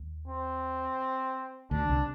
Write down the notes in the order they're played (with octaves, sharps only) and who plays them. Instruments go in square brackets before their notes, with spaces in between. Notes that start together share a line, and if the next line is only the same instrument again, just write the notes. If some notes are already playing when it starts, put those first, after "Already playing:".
Already playing: [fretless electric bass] D#2
[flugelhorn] C4
[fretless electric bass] D2 D3 [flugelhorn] D4
[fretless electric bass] C2 C3